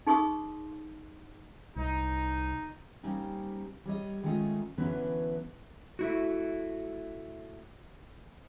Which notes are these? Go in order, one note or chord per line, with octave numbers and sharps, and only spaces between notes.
D#4 G#4 C6 C#6 D#6
C2 D#4
G3 A#3 C4 C#4 D#4
G3 C#5 D#5
D#3 G#3 A3 C#4 F4 D#5
D3 E3 F#3 B3 C#4 B4
A3 E4 F#4